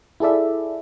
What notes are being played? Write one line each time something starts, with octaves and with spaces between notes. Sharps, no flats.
E4 G#4 A4 D5 E5